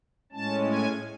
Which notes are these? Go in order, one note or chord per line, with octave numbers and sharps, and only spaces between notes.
A2 G#3 C#4 A5
G#5